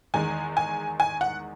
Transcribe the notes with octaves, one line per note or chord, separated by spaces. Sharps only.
E2 D#3 G#3 G#5
G#5
G#5
F#5